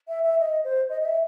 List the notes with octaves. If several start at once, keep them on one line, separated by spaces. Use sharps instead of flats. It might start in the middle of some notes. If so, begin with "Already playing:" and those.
E5
E5
D#5
C5
D#5
D#5
E5